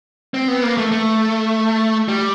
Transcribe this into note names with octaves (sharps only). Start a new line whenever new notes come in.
C4
B3
A#3
A3
A3
G3